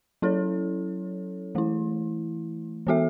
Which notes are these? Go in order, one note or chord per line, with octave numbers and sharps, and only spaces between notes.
F#3 C#4 E4 A4 C#5
E3 A3 E4
E3 B3 F#4 A4 E5